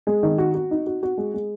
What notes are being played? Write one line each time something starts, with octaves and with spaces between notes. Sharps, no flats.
G#3
D#3
F#4
F#4
D#4
F#4
F#4
G#3
G#3